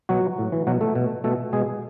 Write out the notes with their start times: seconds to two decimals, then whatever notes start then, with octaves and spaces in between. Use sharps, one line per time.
0.09 B2 F#3 F#4
0.38 A2
0.52 E3
0.67 B2 F#3 F#4
0.81 A3 A4
0.95 B2
1.24 B2 A3 A4
1.53 B2 G#3 G#4